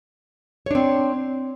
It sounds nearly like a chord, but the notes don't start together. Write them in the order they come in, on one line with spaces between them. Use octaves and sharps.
C#5 D4 C4